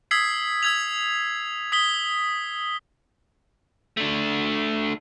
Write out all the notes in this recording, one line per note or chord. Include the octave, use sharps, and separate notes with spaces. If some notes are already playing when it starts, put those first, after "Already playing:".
D#6 E6 G#6 B6 C7
E6 G#6 F7
D#6 B6 G7
A3 D4